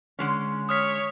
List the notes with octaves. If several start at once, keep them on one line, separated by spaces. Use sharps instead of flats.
D3 G#3 C#4
C#5 D#6 F6 B6